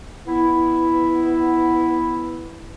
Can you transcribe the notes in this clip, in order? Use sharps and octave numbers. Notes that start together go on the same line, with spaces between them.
B3 E4